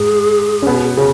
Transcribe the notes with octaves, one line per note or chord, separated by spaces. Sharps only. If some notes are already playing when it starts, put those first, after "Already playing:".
Already playing: G#2 G#4
C#4
B2 B3
C#3